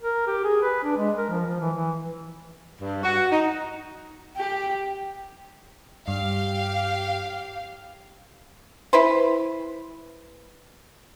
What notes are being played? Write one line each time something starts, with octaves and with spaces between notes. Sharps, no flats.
A#4
G4
G#4
B4
D4
G#3
A#4
F3
F3
E3
E3
G2
F#4
D#4
G4
G2 G4 F5
E4 B4 C5